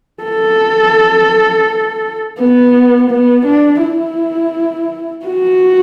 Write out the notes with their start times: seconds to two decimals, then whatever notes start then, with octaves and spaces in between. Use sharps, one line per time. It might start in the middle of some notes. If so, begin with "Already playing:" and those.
0.23 A4
2.39 B3
3.10 B3
3.46 D4
3.83 E4
5.26 F#4